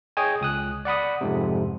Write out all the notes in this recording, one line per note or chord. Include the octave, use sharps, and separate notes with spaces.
G#4 C#5 D#5 G5 G#5
C#2 D#6 F#6
D5 F#5 B5 D#6
F2 G#2 C3